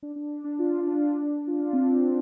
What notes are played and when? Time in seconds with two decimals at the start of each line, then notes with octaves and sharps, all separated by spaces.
0.03 D4
0.16 D4
0.44 D4
0.59 F4
0.80 F4
0.87 D4
1.47 F4
1.59 D4
1.73 C4
2.01 D4